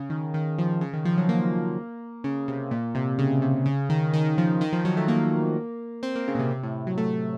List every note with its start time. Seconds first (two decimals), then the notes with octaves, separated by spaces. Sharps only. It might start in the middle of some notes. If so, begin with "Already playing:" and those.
Already playing: C#3
0.10 D#3
0.34 D#3
0.59 F3
0.81 C#3
0.93 D#3
1.05 F3
1.18 F#3
1.29 A#3
2.24 C#3
2.48 C3
2.71 A#2
2.95 C3
3.19 C#3
3.42 C3
3.66 C#3
3.89 D#3
4.14 D#3
4.38 F3
4.61 D#3
4.73 F3
4.85 F#3
4.97 A3
5.08 A#3
6.03 C4
6.15 A#3
6.28 C#3
6.35 A#2
6.39 C3
6.51 C3
6.63 A2
6.87 F#3
6.98 A3